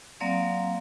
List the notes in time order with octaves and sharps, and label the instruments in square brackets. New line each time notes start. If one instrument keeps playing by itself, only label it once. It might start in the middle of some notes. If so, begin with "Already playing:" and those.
[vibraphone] F#3 A#3 C4 D5 F5